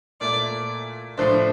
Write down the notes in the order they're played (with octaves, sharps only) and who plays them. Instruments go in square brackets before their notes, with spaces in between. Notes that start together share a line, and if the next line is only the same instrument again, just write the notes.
[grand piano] A#2 A3 E4 [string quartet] D5
[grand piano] A2 F3 A3 D4 [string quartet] C5